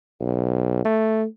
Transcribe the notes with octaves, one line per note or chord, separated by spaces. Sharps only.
B1
A3